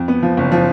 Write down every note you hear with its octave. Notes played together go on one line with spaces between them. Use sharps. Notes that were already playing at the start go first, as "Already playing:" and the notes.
Already playing: F2
B3
F3
F#1
F3